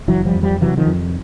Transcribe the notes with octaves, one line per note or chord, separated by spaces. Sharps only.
F#1 E3 F#3
F3 G3
F2
F3 G3
C3 E3 F#3
D#3 F3
F2